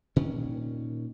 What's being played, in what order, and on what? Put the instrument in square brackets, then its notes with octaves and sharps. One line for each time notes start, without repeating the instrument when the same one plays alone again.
[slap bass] A#2 D#3 C#4